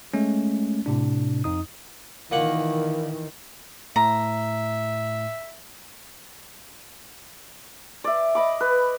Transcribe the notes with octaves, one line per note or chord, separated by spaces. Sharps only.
G#3 A3 C#4
A2 C3 D4
F2 D#4 D#6
A#2 D#3 E3 A#3 F#5
A2 E5 A#5
D5 E5
D#5 B5 D6
B4